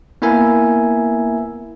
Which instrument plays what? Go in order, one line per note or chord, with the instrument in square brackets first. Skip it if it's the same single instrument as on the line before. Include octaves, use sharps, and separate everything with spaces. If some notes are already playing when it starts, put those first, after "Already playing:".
[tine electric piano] A#3 B3 E4 A#4 E5 G#5